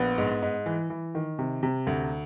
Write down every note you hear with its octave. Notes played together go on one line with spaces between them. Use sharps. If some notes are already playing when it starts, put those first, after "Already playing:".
Already playing: A#1 B3
G#2
G#2
E3
E3
D#3
C3
C3
D2